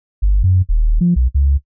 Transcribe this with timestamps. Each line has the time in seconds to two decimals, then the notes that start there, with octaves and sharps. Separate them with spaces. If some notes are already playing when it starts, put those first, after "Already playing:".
0.22 G1
0.43 F#2
0.69 D#1
1.01 F3
1.16 B1
1.34 C#2